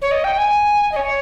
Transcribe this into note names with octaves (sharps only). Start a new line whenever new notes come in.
C#5
D#5
G5
G#5
D#5
C#5